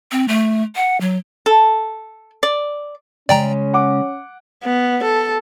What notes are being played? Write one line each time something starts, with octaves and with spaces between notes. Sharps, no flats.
C4
A3
F#5
F#3
A4
D5
C#3 G#3 C#4 D5 G5 A#5
F#5 D6
B3
A4